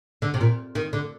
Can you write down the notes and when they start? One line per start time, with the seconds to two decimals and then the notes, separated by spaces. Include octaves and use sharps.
0.22 D3
0.34 C3
0.41 A#2
0.75 D#3
0.93 D3